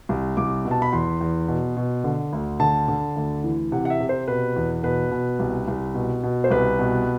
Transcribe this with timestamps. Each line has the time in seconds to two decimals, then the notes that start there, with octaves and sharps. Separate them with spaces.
0.09 C2
0.37 C2 D6
0.65 B2
0.71 A5
0.82 B5
0.92 E2 C6
1.21 E2
1.48 B2
1.77 B2
2.04 D3
2.33 D2
2.60 D3 A5
2.88 D3
3.16 D2
3.44 E3
3.72 C3 F#5
3.85 F#5
3.90 E5
4.00 C3
4.09 C5
4.28 B2 B4
4.56 E2
4.83 B2 B4
5.11 B2
5.39 C2
5.68 C2
5.95 B2
6.23 B2
6.44 C5
6.50 C2 B4
6.79 B2